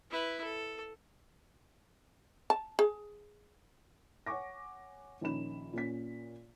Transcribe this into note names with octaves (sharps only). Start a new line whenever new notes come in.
E4 B4
A4
A5
G#4
C#5 F#5 G#5 C#6 D6 A#6
A#1 D#3 C#4 D#4 B5 E7
A#2 C#4 B6